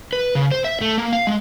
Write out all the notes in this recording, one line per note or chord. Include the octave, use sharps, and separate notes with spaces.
B4
C#3
C5
E5
A3
A#3
F5
G#3